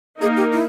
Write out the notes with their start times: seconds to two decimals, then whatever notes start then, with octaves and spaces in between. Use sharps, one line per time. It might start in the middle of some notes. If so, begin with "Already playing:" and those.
0.22 A#3 D#4 G#4 A#4
0.37 G4
0.53 E4